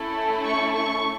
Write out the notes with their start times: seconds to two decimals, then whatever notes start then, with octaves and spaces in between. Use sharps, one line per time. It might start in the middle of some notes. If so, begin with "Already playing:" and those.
Already playing: A3 C#4 E4 A4
0.45 C#6
0.76 C#6